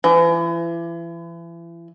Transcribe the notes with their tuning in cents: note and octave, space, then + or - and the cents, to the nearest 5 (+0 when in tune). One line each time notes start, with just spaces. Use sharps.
E3 +35